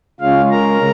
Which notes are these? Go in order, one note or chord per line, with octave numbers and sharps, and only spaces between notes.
C#3 G#3 C#4 F4 F5
A#4 A#5